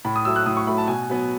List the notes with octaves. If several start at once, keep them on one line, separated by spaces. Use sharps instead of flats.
A2 B5
D#6
F#3 A3 E6
F#6
A2 D#6
C#6
F#3 A3 B5
A5
B2 G#5
F#3 B3